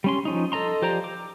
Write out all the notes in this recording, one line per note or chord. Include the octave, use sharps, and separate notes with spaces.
G3 C#4 C6
F3 C#4 D#4
A4 D#5 A#5 C6
F3 G4 C5 D5 A#5
D6